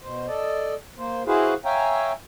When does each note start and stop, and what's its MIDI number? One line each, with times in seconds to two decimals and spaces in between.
0.02 0.27 47
0.02 0.27 72
0.28 0.74 69
0.28 0.74 74
0.28 0.74 75
0.98 1.23 58
0.98 1.23 72
1.27 1.54 64
1.27 1.54 66
1.27 1.54 68
1.27 1.54 71
1.27 1.54 72
1.27 1.54 77
1.65 2.12 73
1.65 2.12 76
1.65 2.12 77
1.65 2.12 79
1.65 2.12 80
1.65 2.12 82